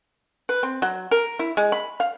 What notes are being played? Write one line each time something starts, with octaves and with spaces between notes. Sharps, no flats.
B4
C4
F#3
A#4
E4
G#3
B5
F5